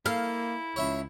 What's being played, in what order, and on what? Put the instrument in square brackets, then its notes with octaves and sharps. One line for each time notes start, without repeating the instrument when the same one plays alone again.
[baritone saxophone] A#3 [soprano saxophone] E4 [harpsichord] A4 [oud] F5
[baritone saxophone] C#2 [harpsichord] C#5 E5 B5